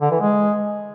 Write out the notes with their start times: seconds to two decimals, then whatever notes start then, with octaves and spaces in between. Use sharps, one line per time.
0.01 D3
0.11 E3
0.21 G#3